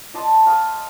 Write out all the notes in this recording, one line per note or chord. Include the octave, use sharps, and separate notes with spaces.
D5 D#5 A5 C6
F5 D#6